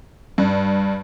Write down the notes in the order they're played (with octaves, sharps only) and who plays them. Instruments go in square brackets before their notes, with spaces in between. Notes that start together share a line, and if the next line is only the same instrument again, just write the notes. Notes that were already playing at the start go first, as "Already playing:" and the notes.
[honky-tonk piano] G2